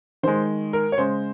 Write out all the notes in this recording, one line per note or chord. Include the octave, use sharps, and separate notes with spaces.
D#3 G#3 C5
A#4
C#5
C#3 G#3 C5